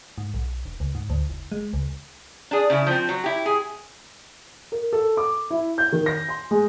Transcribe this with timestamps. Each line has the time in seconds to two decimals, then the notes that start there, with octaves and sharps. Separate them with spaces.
0.18 G#2
0.34 B1
0.65 E1
0.80 C#2
0.95 G#2
1.10 D2
1.30 F#1
1.52 G#3
1.73 C#2
2.51 D4 G#4
2.70 C#3 E4
2.87 F3 C4
3.09 F#3
3.24 E4 G4
3.46 G#4
4.72 A#4
4.93 A4
5.17 D6
5.51 E4
5.78 G6
5.92 D#3
6.06 A#6
6.29 C6
6.51 G#3